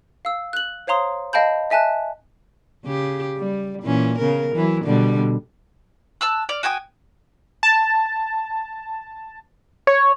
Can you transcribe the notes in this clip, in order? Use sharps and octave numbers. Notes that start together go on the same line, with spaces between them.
F5 E6
F#6 F#7
C5 C#5 F5 A#5 C6 D#6
D#5 F5 G5 A5 B5 G6
D#5 E5 G#5 A5 F#6
C#3 G4
G3
A#2 E3 C#4
C#3 B3 A#4
E3 F#3 E4
B2 D3 G3
A5 E6 F#6
D5 F6
F#4 G5 G#5 D#6
A5
C#5